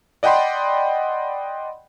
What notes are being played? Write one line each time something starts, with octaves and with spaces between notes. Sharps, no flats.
D5 D#5 F#5 G5 B5 C6